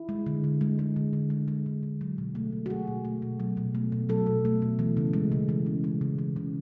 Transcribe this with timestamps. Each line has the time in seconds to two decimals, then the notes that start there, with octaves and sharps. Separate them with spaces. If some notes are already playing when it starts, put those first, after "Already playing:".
Already playing: E4
0.09 G#3
0.26 D3
0.44 D3
0.61 G#3
0.79 G#3
0.96 D3
1.13 D3
1.30 G#3
1.48 G#3
1.66 D3
1.83 D3
2.01 F#3
2.18 B2
2.35 A3
2.52 B2
2.66 F#4
2.70 F#3 G#4
2.88 B2
3.05 A3
3.22 B2
3.40 F#3
3.57 B2
3.75 A3
3.92 B2
4.09 F#3 A4
4.26 B2
4.45 A3
4.62 B2
4.79 E3
4.97 C#3
5.13 G#3
5.32 C#3
5.49 E3
5.66 C#3
5.84 G#3
6.01 C#3
6.19 E3
6.36 C#3